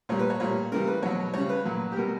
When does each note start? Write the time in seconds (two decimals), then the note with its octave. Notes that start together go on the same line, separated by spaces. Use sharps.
0.09 A#2 G3 C#5
0.19 B4
0.30 C#5
0.40 A#2 G3 C#5
0.72 C#3 E3 G3 A#4
0.87 B4
1.02 B2 F#3 C#5
1.34 C#3 G3 C#5
1.49 B4
1.65 A#2 F#3
1.92 G4
1.96 B2 G3 A#4